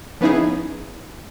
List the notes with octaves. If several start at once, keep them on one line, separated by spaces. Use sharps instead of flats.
F3 B3 C#4 D#4 E4 G#4